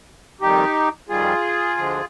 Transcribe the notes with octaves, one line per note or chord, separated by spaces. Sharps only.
F2 D#3 G3 D#4 G4
F2 D#3 G3 F4 G#4
D2 D3 F3 G#3